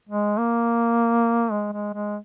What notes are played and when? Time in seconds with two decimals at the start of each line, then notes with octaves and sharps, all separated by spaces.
0.09 G#3
0.38 A#3
1.51 G#3
1.73 G#3
1.94 G#3